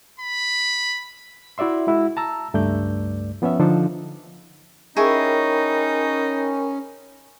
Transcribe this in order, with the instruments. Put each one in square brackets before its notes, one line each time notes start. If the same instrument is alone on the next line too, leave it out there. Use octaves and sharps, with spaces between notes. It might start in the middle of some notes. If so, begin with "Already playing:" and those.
[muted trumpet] B5
[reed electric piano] E4 F#4 D5 E5 C6
G#3 E4 F#4
A5 A#5 E6
C#2 G2 A3 D5 G6
F3 B3 C#4 C#5 E5
D3 F3 D4 D#4 A4 C5
[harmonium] C#4 [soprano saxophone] D#4 [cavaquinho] E4 G#4 C#6 [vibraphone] A#4 G5 B5